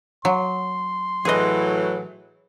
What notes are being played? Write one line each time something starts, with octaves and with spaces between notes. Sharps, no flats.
F#3 C6
A2 E3 F#3 G#4 D#5